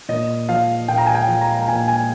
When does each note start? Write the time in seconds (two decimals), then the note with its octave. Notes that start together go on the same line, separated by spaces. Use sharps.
0.09 A#2 D#5
0.49 F3 F5
0.88 A#2 G5
0.98 A#5
1.06 G#5
1.15 G5
1.28 F3
1.41 A#5
1.59 A#5
1.68 A#2 G#5
1.88 G#5